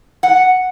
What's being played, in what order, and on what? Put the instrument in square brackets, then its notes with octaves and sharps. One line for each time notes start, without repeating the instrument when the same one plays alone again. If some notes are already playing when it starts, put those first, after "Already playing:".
[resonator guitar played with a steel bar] F#5